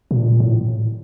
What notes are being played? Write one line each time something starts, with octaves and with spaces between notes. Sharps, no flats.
B2
A#2
A2